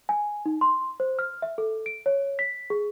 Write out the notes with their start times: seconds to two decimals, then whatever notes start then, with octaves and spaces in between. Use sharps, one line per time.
0.09 G#5
0.46 D#4
0.61 C6
1.00 C5
1.19 F6
1.42 E5
1.58 A4
1.86 D7
2.06 C#5
2.39 B6
2.70 G#4